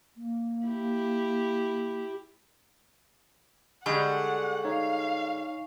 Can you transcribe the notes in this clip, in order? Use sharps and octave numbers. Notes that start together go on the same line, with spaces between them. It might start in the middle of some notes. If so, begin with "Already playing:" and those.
A#3
E4 G4
D3 G3 G#3 F#5 G#5 C#6
D#4 C#5 F5